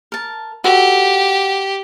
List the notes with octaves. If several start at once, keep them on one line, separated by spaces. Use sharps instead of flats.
A#4 A5
F#4 G4 A4